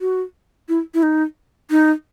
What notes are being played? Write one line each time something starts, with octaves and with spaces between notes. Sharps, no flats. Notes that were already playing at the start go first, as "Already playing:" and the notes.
F#4
E4
E4
D#4
D#4